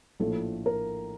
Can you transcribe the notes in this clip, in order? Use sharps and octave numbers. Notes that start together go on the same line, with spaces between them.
A#1 A2 F3 A3 A4
A#4